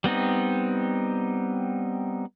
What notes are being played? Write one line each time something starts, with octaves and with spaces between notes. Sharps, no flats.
G3 B3 C4 D#4